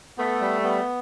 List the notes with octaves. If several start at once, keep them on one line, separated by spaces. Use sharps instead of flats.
A3 B3
G3
B3